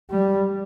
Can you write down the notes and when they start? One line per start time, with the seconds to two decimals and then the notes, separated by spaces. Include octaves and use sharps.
0.10 G3